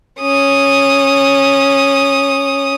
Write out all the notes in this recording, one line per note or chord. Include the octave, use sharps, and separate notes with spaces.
C#4 D#6